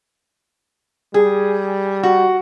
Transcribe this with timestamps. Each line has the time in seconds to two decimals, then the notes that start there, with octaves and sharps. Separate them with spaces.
1.14 G3 G#4
2.03 F#4